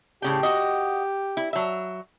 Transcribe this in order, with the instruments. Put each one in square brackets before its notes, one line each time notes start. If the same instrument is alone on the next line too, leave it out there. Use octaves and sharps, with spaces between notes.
[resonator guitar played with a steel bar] A2 C#3 G5 [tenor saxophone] G4
[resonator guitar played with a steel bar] F#4 D#5
E4
F#3 E5